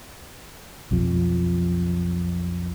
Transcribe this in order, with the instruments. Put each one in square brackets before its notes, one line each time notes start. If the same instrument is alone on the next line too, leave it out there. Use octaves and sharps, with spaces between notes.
[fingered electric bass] B1 F2 F3